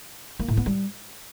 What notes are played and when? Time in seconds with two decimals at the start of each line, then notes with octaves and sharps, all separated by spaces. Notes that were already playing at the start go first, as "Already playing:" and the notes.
0.40 A#3
0.48 A2
0.57 B3
0.66 G3